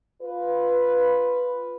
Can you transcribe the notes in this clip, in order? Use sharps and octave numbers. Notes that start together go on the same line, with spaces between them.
F4 B4